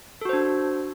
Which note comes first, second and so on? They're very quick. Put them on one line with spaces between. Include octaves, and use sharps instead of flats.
A4 F#4 C5 D4